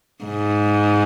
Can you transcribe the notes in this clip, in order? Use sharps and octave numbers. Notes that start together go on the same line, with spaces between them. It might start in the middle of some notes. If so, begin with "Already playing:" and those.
G#2